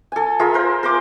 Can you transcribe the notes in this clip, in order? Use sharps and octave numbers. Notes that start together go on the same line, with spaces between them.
A4 G#5
F4 G#4 A#4 E5
A#4 C5
A#4 C6 D6